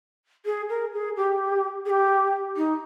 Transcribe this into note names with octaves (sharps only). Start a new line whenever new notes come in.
G#4
A#4
G#4
G4
G#4
G4
D#4